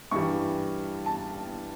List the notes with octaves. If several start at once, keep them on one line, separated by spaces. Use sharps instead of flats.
G2 E3 G3 C#6
A5